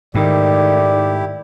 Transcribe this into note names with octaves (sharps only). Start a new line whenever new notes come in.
G#2 D#3 A3 E4 G4 D5